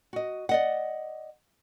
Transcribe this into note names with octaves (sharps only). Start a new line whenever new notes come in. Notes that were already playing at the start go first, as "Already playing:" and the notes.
F#4 D#5
D5 D#5 F#5